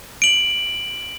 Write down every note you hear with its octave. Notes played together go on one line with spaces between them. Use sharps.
D7 F#7